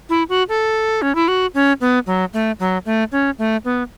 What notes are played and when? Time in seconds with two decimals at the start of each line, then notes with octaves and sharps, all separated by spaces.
0.09 E4
0.29 F#4
0.49 A4
1.02 C#4
1.15 E4
1.28 F#4
1.54 C#4
1.81 B3
2.07 F#3
2.33 A3
2.60 F#3
2.86 A3
3.12 C#4
3.38 A3
3.65 B3